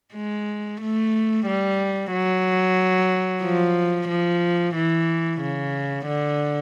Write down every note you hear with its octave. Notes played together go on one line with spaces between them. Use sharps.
G#3
A3
G3
F#3
F3
F3
E3
C#3
D3